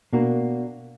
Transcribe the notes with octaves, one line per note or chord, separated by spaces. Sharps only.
B2 A#3 D4 F#4